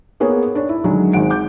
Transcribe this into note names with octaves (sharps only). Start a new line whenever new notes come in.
A#3 B3 G#4 B4 C#5
D4 C#5
E4
D3 D#3 F#3 G#3
G#1 G#3 F#5 D7
D6 G6